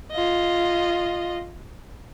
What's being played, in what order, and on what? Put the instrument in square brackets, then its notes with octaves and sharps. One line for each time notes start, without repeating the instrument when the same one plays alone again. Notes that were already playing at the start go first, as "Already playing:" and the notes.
[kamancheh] F4 D#5